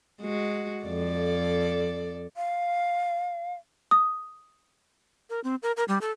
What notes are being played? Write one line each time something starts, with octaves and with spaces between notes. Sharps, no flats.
G#3 F#4
F2 A4 D5
F5
D#6
A#4
C4
A#4
A#4
G3
A4